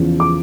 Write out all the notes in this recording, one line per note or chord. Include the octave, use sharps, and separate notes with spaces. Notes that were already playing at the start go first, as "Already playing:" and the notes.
Already playing: E2 C#3 F3
D6